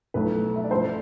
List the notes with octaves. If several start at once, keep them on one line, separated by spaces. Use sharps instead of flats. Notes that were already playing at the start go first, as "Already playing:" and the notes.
B1 A2 F3 A3 B4
E5
D5
A1 G2 F3 A3 A4 C5